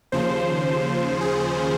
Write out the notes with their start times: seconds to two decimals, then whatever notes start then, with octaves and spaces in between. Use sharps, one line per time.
0.12 D#2 C#3 F3 C5
1.21 G#4